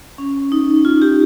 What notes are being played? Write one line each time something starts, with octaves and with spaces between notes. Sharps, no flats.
C#4
D#4
F4
G4